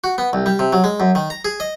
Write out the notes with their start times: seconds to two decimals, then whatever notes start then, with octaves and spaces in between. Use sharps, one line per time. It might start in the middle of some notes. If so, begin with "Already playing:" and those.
0.04 F#4
0.18 B3
0.33 C2
0.46 G3
0.59 C3
0.73 F#3
0.84 G#3
1.00 F#2
1.15 D#3
1.30 A#5
1.45 G#4
1.60 D#5